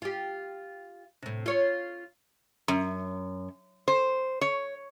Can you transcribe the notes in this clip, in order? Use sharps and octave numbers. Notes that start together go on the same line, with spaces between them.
F4 G4
A2 C3
F4 C#5
F#2
C5
C#5